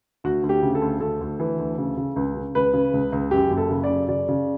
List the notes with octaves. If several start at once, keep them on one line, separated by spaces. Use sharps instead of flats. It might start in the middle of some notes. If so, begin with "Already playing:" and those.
D2 F#4
D2
G4
C#3
A4
D2
D2 A4
D2
E3
D2
C#3
C#3
C#2
C#3
C#2 B4
C#3
C#2
C#2
F#2 G4
F#1
A4
C#3
D5
F#2
C#3 D5
C#3